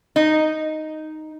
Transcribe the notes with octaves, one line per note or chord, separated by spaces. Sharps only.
D#4